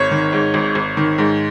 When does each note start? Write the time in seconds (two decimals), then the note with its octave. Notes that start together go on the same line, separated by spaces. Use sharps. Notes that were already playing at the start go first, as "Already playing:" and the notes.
Already playing: G#1 C#5
0.11 D#3
0.33 G#2
0.54 G#1
0.75 G#1
0.97 D#3
1.18 G#2